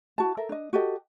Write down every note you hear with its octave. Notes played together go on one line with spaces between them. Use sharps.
E4 F#4 A5
A4 A#4 E5
D4 D#5
F#4 G4 A4 D#5